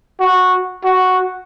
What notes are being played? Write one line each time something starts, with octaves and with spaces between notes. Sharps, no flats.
F#4
F#4